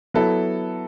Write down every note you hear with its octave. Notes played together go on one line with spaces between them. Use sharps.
F#3 B3 E4 A4